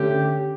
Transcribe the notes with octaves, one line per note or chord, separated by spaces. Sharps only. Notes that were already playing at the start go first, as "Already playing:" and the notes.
Already playing: D3 A3 C#4 G4